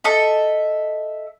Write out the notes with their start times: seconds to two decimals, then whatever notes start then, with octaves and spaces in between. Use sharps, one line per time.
0.04 A4 D#5 E5